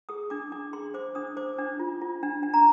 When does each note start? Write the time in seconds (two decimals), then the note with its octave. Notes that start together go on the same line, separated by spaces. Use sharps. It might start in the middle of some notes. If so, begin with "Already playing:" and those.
0.09 G#4 D#6
0.30 D4 D6
0.52 D4 D6
0.73 G#4 C6
0.94 C5 D6
1.15 D4 D#6
1.36 C5 D6
1.59 D4
1.80 F4
2.01 F4
2.23 D4
2.43 D4
2.54 A#5